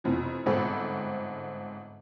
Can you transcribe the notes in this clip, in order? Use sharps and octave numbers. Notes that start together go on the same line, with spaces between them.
F1 F2 E3
G1 G#2 C4 A4 B5